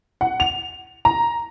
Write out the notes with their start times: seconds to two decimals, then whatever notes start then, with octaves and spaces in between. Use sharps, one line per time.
0.21 F#5
0.40 F7
1.05 A#5